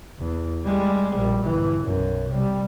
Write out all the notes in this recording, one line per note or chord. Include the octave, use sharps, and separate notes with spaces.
E2
G3 G#3
A#1 G3
G1 E3
B1 F#2
C3 G3